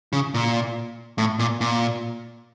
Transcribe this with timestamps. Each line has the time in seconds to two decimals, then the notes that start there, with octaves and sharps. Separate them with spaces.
0.13 C#3
0.34 A#2
1.18 A2
1.39 A#2
1.61 A#2